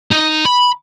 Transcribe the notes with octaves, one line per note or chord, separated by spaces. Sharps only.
D#4
B5